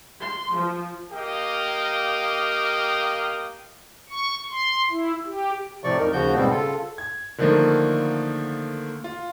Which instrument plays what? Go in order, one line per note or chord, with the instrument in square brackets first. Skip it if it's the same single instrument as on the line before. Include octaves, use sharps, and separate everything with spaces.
[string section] C6
F3
[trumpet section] A#3 G4 D#5 F5 G5
[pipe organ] C#6
C6
E4
G4
[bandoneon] A2 C3 F3 D5 C#6
F2 D#4 A#4
D#2 C#3 F3 F#4 G6
G#2 B2 G3 G#3 B3 C4
C#3 F4 A4
[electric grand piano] G#6
D3 D#3 F3 A3 A#3
F4